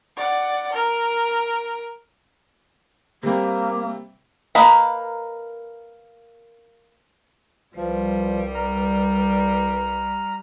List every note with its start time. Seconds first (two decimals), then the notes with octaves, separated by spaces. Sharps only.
0.17 D5 F#5
0.73 A#4
3.23 C3 G3 A#3
4.55 A#3 A#4 B4 D#5 B5
7.77 C2 F3 G3 B4
8.55 A#5 F6